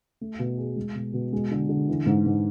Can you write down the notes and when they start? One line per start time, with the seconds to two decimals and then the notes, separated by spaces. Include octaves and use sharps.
0.21 A3
0.39 B2
0.58 G#4
0.76 G#3
0.95 B2
1.13 B2
1.33 G#3
1.51 D3
1.69 D3
1.89 E3
2.06 G#2
2.26 G#2